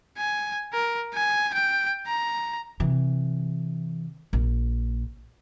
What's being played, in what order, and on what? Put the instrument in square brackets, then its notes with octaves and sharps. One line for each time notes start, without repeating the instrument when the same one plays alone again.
[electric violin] G#5
A#4
G#5
G5
A#5
[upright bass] C3 E3
A#1